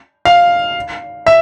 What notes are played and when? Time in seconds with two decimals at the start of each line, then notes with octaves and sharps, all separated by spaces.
0.25 F5
1.27 E5